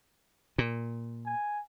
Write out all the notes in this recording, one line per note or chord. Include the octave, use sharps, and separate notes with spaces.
A#2
G#5